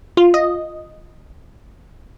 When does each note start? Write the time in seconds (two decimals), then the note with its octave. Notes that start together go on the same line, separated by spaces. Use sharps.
0.17 F4
0.34 D#5